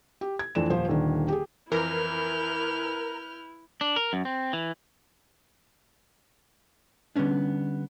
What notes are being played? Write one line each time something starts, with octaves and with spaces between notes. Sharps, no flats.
G4
G#6
F2 E3 A3 D4 E7
D#1 F3 C5
D#1 D3 D#3
G4 G#4
F2 E3 E4 A#4 B4 F6 G6
D4
A#4
F#2
C4
E3
D3 G3 B3 C#4 D4